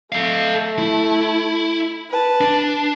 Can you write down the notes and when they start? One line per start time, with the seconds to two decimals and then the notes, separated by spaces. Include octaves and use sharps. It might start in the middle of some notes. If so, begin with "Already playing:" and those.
0.12 A3 A4 F5
0.78 E4
2.10 B4 A5
2.41 D4